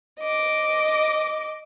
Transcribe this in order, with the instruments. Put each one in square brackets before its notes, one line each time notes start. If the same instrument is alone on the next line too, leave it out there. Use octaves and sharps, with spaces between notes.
[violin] D#5 D6